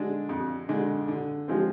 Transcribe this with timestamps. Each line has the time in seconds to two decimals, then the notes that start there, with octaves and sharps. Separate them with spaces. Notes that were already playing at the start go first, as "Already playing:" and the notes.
Already playing: D3 G#3 D4
0.29 F2
0.69 D3 G#3 D4
1.08 D3
1.48 F3 G#3 C4